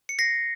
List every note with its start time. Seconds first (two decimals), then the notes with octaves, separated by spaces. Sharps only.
0.09 C#7
0.19 A#6 C7